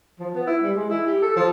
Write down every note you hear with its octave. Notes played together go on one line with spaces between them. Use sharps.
F3
B3
E4
G3
G#3
E4
G4
A4
F3